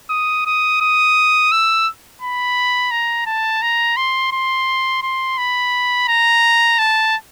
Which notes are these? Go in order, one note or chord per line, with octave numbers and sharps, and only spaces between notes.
D#6
D#6
D#6
E6
B5
A#5
A5
A#5
C6
C6
C6
B5
A#5
A5